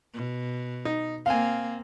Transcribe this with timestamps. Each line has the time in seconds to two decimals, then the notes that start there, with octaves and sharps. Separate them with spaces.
0.14 B2
0.85 D#4
1.26 A#3 C4 F5 G#5